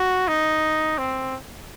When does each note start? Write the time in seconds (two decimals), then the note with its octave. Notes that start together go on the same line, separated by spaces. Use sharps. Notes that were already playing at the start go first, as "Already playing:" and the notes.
Already playing: F#4
0.28 D#4
0.98 C4